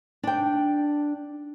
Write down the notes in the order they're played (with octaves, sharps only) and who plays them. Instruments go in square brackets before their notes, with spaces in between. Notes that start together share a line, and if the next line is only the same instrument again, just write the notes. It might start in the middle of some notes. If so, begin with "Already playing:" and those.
[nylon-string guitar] D4 G5